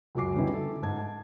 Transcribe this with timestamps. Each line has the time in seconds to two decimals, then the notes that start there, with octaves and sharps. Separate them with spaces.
0.15 C#2 F#2 F#4 G#5 D6 C7
0.35 D3 G3 B3 C#4 D#4 E4
0.54 A4
0.82 G#2 A5 G#6
0.98 A5